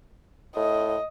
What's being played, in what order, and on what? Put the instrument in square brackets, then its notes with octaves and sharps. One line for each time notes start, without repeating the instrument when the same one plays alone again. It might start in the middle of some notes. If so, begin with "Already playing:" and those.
[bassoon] A2 [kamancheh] D#5